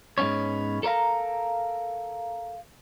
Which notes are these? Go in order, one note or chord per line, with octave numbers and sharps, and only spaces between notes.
G#2 G#3 B3 C#4 C#5
A4 A#4 C#5 F5 A#5